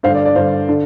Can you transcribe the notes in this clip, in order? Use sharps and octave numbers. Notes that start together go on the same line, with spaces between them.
G2 D3 C5 F5
D5
D5
G2 D3 C5 F5
D3